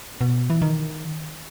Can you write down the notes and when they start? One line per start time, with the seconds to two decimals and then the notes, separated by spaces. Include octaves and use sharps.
0.21 B2
0.50 E3
0.62 D#3